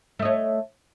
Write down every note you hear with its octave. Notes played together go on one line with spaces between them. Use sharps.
A3 C#5 D#5